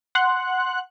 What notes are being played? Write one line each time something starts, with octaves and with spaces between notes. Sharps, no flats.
F#5 C6 F#6